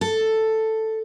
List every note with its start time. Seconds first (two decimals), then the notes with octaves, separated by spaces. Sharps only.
0.01 A4